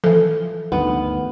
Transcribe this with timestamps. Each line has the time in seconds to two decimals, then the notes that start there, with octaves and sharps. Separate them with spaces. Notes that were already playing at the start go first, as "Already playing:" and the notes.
0.04 E3 F3 A4
0.72 D2 G2 D#3 B3